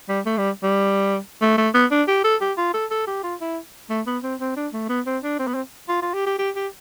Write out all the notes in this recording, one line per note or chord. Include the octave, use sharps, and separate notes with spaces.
G3
A3
G3
G3
A3
A3
B3
D4
G4
A4
G4
F4
A4
A4
G4
F4
E4
A3
B3
C4
C4
D4
A3
B3
C4
D4
C4
B3
C4
F4
F4
G4
G4
G4
G4